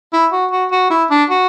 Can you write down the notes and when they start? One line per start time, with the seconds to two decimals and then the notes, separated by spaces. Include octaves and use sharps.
0.13 E4
0.32 F#4
0.51 F#4
0.71 F#4
0.90 E4
1.10 D4
1.30 F#4